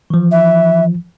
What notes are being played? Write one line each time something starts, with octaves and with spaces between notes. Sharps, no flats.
E3 F3
E5